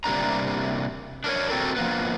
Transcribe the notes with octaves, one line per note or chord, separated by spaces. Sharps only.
C3 G3 A#3 D4 A#5
D4 A#4 C#5
C4 F#4 G4 A4 A#4
F3 A#3 B3